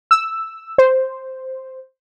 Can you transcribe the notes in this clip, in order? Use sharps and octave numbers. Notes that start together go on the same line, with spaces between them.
E6
C5